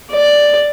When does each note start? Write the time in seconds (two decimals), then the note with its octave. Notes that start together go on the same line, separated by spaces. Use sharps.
0.11 D5